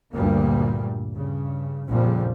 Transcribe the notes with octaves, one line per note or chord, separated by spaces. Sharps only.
D2 G2 A#2 G3 A#3
G2 C#3
A#1 F2 C#3 F3 G3